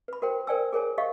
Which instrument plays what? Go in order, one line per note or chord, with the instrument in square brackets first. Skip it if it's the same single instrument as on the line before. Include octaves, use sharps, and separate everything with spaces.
[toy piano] B4 B5
F#4 A#4 C5 G5
A#4 C5 D5 G5 G#5 E6
G#4 A#4 C#5 G#5
G4 D#5 F5 C#6